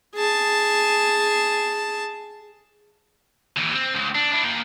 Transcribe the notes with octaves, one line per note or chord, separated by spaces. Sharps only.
G#4 A5
D#2 E3
C4
C#2
D4
D4 E4
A#3 G5